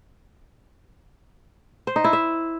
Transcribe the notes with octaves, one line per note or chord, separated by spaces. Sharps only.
C5
D#4
E4
E5